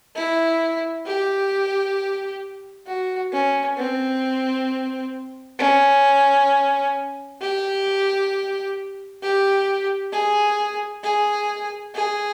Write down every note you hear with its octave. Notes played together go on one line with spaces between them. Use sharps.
E4
G4
F#4
C#4
C4
C#4
G4
G4
G#4
G#4
G#4